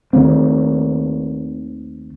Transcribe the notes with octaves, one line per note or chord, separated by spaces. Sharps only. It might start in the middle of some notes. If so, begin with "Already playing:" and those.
D#2 D#3 A3 C4